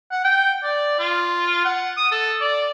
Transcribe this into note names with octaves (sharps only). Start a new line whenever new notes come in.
F#5
G5
D5
F4
F#5
D#6
A4
D5